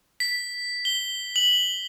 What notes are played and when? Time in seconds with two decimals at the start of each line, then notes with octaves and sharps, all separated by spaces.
0.20 B6
0.85 G7
1.36 F#7